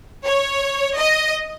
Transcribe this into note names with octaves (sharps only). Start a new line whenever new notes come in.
C#5
D#5